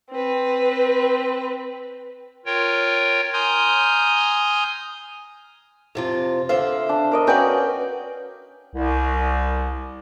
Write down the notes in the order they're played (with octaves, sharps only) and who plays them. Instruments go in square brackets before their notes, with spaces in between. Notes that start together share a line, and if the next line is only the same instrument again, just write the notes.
[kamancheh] C4 B4
[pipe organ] F4 A#4 C#5 G5
G#5 A#5 C6 D#6 F6 G6
[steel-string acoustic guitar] F2 C3 F4
[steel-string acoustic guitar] D3 C5 E5 [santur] F5
[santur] D4
A#4 D5 D#5
[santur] C#4 G5 [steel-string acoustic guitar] F#4 B4 D5
[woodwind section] C2